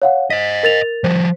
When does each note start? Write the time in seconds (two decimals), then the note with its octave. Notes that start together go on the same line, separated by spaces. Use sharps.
0.02 C#5 F5 F#5
0.30 C5 D#5 B6
0.63 A#4 A6 F7
1.04 F3 G3 C5